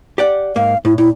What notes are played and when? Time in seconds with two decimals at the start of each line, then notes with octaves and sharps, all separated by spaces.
0.18 G4 D5 F#5
0.56 G#2 A#3 F5
0.85 A2 E4
0.98 A#2 E4